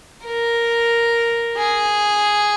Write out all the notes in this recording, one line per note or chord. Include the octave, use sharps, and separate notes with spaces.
A#4
G#4